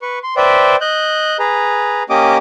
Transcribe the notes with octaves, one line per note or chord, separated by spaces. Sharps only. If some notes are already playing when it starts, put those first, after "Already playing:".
B4 C#6
C6
B4 C5 D5 E5 G5
D#5 F#6 G6
G#4 B4 A#5
A#3 C#4 G4 D#5 D6 D#6